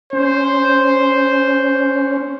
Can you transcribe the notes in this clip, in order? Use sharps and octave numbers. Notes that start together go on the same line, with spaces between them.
C#4 C5